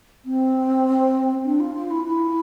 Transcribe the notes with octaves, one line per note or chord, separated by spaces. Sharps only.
C4
D4
F4
F4
E4
E4